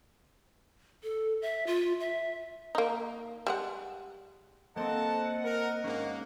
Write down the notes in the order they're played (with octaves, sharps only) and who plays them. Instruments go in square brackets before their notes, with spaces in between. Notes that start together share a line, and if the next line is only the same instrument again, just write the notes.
[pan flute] A4
E5
F4
E5
[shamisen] A#3 D#4
G3 G#3 F#5
[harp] A#3 C4 [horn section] A4 C5 A5 [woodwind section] D#5 F#5
[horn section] A#4
[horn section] G#2 A#3 [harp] C#4